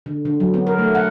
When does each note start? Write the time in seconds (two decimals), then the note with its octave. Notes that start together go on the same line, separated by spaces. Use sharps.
0.06 D3
0.25 D3
0.40 F#3
0.54 B3
0.67 A#4
0.79 A3
0.95 F#5